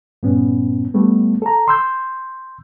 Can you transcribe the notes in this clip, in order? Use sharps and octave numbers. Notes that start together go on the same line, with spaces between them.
G2 A#2 B3 C#4
G3 A3 B3
A4 A#5
C6 E6 G6